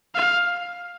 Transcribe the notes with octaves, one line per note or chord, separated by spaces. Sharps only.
F5